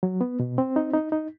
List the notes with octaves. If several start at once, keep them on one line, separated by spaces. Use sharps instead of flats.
F#3
B3
B2
C4
D#4
D#4
D#4